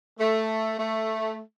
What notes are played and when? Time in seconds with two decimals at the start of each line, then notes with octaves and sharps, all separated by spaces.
0.20 A3
0.78 A3